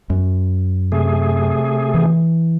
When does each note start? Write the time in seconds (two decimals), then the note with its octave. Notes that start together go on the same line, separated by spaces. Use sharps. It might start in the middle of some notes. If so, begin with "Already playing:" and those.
0.10 F#2
0.92 C3 A3 G#4
1.94 E3